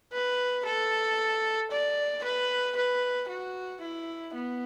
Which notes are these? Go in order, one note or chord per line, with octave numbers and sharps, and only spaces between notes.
B4
A4
D5
B4
B4
F#4
E4
B3